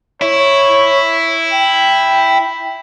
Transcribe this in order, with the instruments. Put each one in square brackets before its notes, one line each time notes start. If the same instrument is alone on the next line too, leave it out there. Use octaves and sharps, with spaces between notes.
[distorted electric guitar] E4 [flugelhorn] C#5
[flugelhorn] G5